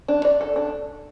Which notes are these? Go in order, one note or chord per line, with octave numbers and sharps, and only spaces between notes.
D4
D5
A4
D4